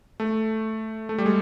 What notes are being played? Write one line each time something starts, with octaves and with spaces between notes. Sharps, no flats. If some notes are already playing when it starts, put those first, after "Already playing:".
A3
A3
G3
G#3